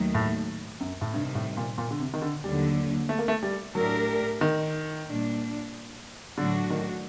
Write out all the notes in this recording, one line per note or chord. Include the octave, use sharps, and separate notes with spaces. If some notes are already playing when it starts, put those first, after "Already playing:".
Already playing: D#2 D#3 F#3 A3
A2
F#2
A2
G2 C3 D#3 G3
A2
A#2
A#2
D3
C3
D#3
D3
D#2 D3 F#3 G3
A3
A#3
A3
G3
A2 F#3 A3 D4 G4 A#4
D#3
A#2 G3 D4
A2 D3 F#3 A3 D4 F#4
D#3